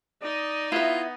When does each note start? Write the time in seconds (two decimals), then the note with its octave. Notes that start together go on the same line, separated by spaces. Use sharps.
0.22 D#4 D5 D#5
0.72 B3 E4 F4 E5